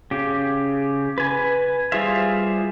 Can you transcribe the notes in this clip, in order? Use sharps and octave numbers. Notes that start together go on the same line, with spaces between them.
C#3 G4
B4 G#5
G3 F4 G#4 C5 E5